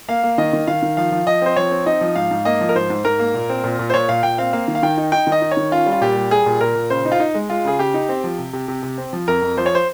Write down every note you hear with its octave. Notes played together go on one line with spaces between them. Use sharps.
A#3 F5
A#3
D#3 D#5
D#3
D#3 F5
D#3
F3 F5
F3
F3 D#5
C4 C5
F3 C#5
C4
D#4 D#5
F3
G#2 F5
G#2
A#3 D#5
F3
A#4
G#2 C5
G#2
G#2 A#4
A#3
A#2
C4
A#2
A#2
C5
A#2 C#5
A#2 F5
A#2 G5
C4 F5
A#3 F5
D#3
F5
D#3 G5
D#4
D#4 G5
D#3
D#5
D#4
C#5
D#3
C#4 F4
G3
F4
A#2 G4
G3
G3 G#4
A#2
A#2 A#4
A#2
C#3 C5
D#4
F4
D#4
G#3
G#3 F4
C#3 G#4
C#3 G4
D#4
C4
F3
C3
C3
C3
C3
C4
F3
F2 A#4
F2
F3 C5
C#5
C5